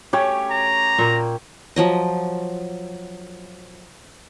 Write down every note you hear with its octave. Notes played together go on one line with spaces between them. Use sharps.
A3 C#4 G4 C#5
A#5
A#2 A#3
F3 F#3 D#5